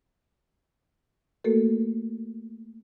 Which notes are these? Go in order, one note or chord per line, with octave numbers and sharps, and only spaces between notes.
A3 A#3 F#4 A4 A#4